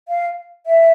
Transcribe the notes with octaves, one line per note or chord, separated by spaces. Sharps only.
F5
E5